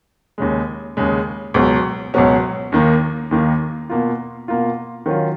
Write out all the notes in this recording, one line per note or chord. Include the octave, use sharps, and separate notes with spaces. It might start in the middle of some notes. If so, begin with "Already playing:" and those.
D#2 C#3 G#3
D#2 C#3 G#3
C#2 B2 F#3 C#4
C#2 B2 F#3 C#4
D#2 D#3 A#3
D#2 D#3 A#3
B2 A#3 F4
B2 A#3 F4
D#3 F#3 C#4 F4